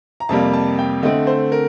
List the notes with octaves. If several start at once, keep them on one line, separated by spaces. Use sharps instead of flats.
A#5
F2 C3 G3 A#3 A5
A5
G5
D3 A3 C4 D#5
C5
A#4